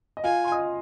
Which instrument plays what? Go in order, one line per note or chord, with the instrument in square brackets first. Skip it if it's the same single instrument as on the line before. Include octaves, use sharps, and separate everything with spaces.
[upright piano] D#5
[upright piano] F4 F5 [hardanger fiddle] G#5
[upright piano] C6
D#5 D#6